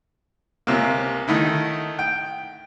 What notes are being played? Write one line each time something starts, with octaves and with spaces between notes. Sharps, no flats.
C#2 C3 A#3
D#3 A3 D#4 E4
G5